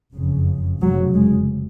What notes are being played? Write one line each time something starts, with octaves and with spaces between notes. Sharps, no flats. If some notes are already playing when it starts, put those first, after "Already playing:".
F#1 F2 C#3
F1 F2 C#3 F#3
G#3